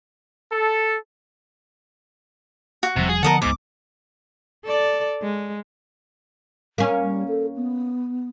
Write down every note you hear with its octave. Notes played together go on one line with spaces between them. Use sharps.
A4
F#4
E1 C3 F3 G3
G#4
D3 F3 B3 A#4 D#5 F#5 A5
C#2 G#2 B3 D6
A4 D5
G#3
A#3 C#4
G3
A4
B3